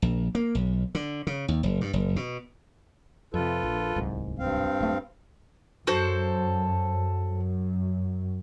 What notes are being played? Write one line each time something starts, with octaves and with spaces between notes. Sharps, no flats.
A#1
A#3
B1
D3
C#3
D#2
F#1
G2
F#1
B2
F2 C3 F4 A4 B4
A#1
D1 C2 G#2
G2 C4 F5
D1 A3
F#2 F#4 A4 C5
F#2